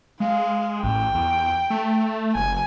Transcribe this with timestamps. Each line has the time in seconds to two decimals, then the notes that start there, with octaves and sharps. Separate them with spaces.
0.20 G#3 F5
0.83 A1 G5
1.15 E2
1.70 A3
2.35 F#1 G#5